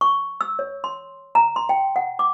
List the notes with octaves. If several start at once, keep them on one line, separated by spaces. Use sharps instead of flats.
C#6
E6
C#5
C6
A#5
C6
G5
F#5
D6